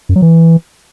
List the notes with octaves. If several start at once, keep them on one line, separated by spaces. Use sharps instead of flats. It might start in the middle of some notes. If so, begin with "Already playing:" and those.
F#2
F#3
E3